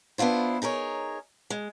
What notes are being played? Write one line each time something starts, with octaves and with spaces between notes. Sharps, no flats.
B3 D4 E4 F4 C5
D#4 G#4 A#4 C#5
G#3